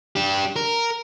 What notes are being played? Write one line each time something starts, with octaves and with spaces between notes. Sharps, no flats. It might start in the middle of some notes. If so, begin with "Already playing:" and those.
D4 G4
A#4